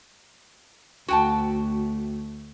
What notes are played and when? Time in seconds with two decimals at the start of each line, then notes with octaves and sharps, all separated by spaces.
1.08 D2 A3 F#4 G5 A5